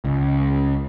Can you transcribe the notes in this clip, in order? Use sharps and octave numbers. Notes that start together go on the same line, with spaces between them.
C#2